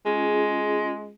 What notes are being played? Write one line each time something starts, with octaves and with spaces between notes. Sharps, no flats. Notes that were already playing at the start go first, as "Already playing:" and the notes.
G#3 C#4 F4 G#4